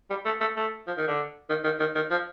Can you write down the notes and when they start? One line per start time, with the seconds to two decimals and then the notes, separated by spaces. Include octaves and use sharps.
0.10 G3
0.25 A3
0.41 A3
0.57 A3
0.87 F3
0.97 D#3
1.08 D3
1.49 D#3
1.64 D#3
1.80 D#3
1.95 D#3
2.10 F3